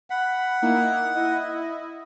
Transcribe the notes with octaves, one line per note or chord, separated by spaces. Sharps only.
F#5 B5
A#3 D#4 E4
E4 D#5